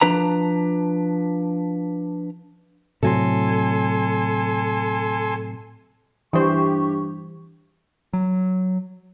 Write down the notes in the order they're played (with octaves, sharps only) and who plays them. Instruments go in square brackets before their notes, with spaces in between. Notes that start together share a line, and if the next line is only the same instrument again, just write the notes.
[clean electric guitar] F3 D4 B4 A#5
[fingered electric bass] A2 C3 F#3 [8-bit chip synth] A4 G#5 C6
[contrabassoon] G2 [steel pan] E3 C5 [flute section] G4 C#6
[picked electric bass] F#3